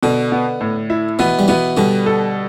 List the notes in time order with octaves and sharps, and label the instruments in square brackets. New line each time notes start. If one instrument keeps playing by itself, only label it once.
[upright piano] B2 [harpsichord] D3
[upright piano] B3
A2
E4
[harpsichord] B2 E3 [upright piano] B3
[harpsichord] G3
[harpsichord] B2 E3 [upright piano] B3
[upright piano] B2 [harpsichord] D3 G3
[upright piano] A4